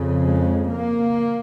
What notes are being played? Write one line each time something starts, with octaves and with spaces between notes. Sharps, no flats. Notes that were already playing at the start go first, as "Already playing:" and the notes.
Already playing: F2 C#3
G#3
A#3